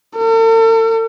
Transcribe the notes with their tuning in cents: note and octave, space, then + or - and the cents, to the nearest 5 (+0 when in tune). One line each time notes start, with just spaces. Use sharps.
A4 +45